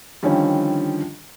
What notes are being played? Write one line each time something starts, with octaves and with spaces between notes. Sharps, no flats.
D3 D#3 F3 G3 C#4